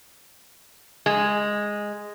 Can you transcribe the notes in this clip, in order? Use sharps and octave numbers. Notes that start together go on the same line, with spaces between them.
G#3